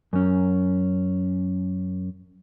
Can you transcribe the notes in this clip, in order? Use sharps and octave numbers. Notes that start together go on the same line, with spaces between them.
F#2 C#4